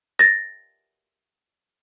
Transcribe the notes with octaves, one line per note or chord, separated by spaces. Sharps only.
A6 A#6